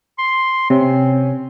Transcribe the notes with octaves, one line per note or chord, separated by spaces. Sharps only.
C6
C3 C4 C#4